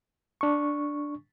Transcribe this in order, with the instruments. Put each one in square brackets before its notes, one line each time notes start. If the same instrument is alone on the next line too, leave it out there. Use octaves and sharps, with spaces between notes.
[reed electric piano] D4 C#6